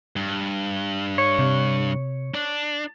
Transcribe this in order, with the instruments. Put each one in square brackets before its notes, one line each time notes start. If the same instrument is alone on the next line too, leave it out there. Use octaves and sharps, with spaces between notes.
[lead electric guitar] G2
[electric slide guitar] C#5
[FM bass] C3
[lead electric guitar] D4